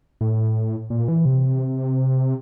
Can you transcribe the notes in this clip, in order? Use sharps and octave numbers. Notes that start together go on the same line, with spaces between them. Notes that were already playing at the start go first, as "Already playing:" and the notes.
A2
A#2
E3
C3